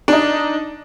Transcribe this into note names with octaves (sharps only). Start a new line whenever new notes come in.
D4 D#4